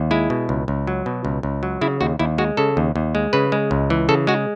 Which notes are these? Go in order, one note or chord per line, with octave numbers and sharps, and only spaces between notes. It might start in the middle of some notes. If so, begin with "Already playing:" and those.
Already playing: D#2
G#3 E4
B2
C#2
C#2
F#3
B2
C#2
C#2
F#3
C#3 E4
D#2 F#4
D#2 E4
G#3 F#4
C#3 A4
D#2
D#2
G#3
C#3 B4
G#3
C#2
E3
C#3 A4
G#3 F#4